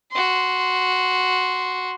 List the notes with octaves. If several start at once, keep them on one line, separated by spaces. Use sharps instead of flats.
F#4 C6